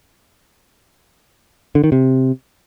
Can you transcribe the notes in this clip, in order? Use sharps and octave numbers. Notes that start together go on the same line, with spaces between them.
D3
D#3
C3